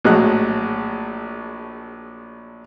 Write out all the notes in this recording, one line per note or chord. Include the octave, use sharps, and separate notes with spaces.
A#1 A2 F#3 G#3 D#5 F#6